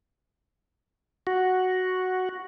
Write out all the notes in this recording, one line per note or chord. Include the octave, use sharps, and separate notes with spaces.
F#4